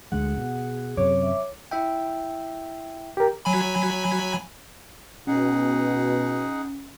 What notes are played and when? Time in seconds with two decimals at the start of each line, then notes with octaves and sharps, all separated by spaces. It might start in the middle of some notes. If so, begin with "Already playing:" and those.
0.12 D2 D3 G#3 G#4 F#5
0.37 B2
0.97 F#2 C3 C#5 D6
1.22 E5
1.71 E4 E5 G5
3.17 G4 A#4
3.45 F#3 G#5 B5
5.27 B2 C#4 D#4 G#4 F#5